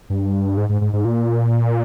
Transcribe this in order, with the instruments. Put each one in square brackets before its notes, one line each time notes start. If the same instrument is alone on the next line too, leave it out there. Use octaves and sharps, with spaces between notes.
[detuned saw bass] G2
G#2
G#2
G#2
G#2
A#2